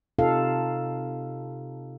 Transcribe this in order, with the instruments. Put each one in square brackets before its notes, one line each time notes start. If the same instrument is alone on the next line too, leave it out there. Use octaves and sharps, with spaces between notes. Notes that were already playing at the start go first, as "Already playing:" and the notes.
[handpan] C3 D#4 F4 A4 F5